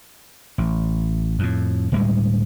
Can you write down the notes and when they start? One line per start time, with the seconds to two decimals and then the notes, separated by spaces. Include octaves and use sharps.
0.58 A1
1.39 F2 A2
1.92 D1 A2 G3 G#3